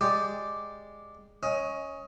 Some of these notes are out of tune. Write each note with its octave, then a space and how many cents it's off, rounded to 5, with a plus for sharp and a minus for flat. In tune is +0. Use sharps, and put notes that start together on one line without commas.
G#3 +0 G4 +0 D5 +0
C#4 +0 D#5 +20